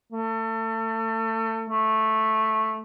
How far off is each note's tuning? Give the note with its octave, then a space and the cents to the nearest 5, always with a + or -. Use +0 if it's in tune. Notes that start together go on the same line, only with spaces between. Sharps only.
A3 +30
A3 -5